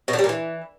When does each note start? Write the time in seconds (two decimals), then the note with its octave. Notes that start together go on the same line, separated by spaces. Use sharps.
0.08 B2
0.13 D3
0.19 G3
0.24 A#2
0.29 E3